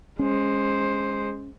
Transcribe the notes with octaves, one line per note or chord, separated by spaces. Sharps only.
G#3 C#4 C5